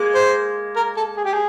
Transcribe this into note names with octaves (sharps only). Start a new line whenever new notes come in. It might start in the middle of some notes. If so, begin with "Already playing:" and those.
Already playing: G#3 A#3
C5
A#4
A4
G#4
G4
G#4